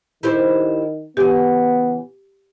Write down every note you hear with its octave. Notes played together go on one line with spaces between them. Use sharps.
D#3 E4 G4 C5
C#3 E3 B3 G4